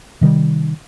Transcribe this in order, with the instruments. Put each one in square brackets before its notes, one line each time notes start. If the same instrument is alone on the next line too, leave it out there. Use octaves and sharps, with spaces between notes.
[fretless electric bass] C3 D#3 G3